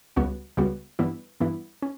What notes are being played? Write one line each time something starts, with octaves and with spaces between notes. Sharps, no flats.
C#2 C#3 G3 B3 F#4
C#2 C#3 G3 B3 F#4
G2 E3 B3 E4
G2 E3 B3 E4
C#4